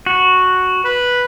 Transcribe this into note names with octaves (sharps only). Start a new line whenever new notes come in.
F#4
B4